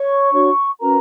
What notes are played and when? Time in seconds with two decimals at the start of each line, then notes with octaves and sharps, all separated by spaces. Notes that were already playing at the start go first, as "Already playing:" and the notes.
Already playing: C#5 C#6
0.32 D4 F#4 C#5
0.80 C#4 F#4 A#4 B4 A#5